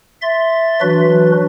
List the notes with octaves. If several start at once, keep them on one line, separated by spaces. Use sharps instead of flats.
E5 C6 A6
E3 F#3 D4 F#4 B4